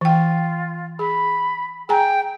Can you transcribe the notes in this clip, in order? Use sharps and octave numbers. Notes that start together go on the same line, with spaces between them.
E3 F4 G5
G#4 B5
G#4 G5 G#5 A#5